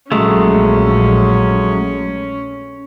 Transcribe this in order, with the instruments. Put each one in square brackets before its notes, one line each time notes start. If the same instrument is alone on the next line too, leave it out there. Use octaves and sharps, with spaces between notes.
[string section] A#1 [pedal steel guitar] F#3 G#3 A3 [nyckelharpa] C#4